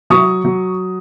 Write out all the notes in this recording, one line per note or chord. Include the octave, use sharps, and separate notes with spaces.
F#3 C#6 D#6
F#3